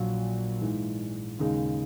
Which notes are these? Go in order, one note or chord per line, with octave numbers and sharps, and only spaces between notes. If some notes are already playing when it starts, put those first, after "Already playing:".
Already playing: A#1 A#2 F#3
G#2 E3 G#3
D#2 C#3 G#3 D#4 G#4